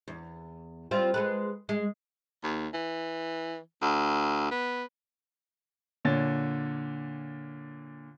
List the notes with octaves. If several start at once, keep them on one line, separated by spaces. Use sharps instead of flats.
E2
G3 C4 F4
G#3 A4 B4
G#3
D#2
E3
D2
B3
A#2 D3 C#5 A6